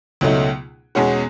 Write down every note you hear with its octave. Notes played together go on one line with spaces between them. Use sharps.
C#2 B2 F#3 A3 D#4
E2 B2 G#3 C#4 F#4